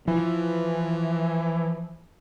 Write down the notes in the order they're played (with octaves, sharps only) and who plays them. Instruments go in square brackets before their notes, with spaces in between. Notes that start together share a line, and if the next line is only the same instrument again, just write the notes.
[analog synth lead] E3 [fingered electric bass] F3